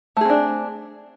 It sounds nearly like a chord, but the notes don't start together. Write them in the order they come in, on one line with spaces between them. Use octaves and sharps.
A3 G#4 C4 D4